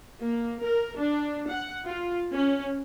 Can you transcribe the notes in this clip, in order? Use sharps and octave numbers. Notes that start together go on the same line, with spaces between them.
A#3
A#4
D4
F#5
F4
C#4